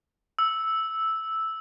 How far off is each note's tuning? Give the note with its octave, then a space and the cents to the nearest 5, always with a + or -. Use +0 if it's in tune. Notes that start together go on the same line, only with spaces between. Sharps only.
E6 -5